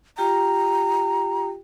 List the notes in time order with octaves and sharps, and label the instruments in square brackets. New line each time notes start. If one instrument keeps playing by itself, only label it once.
[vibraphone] F4 G4 G5 [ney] A#5